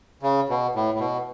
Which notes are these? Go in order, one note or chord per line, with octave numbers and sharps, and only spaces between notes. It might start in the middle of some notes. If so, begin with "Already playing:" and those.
C#3
B2
A2
A2
B2